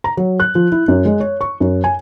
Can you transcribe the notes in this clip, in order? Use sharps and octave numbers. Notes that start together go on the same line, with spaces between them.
A#5
F#3
F#6
F3
E4
F#2
G#3
C#5
C#6
F#2
G#5